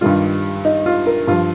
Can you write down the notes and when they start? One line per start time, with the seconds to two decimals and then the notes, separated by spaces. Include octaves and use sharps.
0.01 G2 D#3 G3 F4
0.65 D#4
0.86 F4
1.07 A#4
1.27 G2 F3 F4